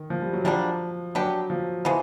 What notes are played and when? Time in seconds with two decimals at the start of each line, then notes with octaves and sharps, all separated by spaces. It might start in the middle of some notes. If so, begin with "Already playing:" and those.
Already playing: D#3
0.10 F3
0.22 G3
0.33 F#3
0.45 D3 F3 G3 A#3 D4
1.15 F#3 B3 D4 G4
1.50 F3
1.85 E3 F3 G#3 B3